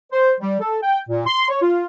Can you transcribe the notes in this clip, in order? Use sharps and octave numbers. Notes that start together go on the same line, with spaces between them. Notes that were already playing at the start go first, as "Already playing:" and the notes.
C5
G3
A4
G5
A#2
C6
C#5
F4